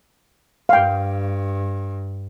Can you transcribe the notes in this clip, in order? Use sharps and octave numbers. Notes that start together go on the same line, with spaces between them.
G2 F5 G5